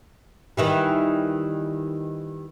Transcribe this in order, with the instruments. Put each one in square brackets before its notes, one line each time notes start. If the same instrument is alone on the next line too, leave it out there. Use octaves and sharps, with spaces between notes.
[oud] D#3 E3 G3